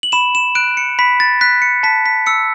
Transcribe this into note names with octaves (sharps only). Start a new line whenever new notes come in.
F#7
B5 E7
E7
F#6 D7
C#7
B5 B6
A6
F#6 B6
C#7
A5 B6
B6
E6 C#7